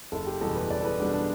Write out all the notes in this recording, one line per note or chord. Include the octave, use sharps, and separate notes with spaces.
F#1 A4
G4
E2 B2 G3 A4
B4
F#1 D5
A4
B4
E2 B2 G3 D4
D4